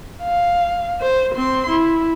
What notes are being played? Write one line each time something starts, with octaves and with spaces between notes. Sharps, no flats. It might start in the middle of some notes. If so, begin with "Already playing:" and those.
F5
C5
C4 C6
E4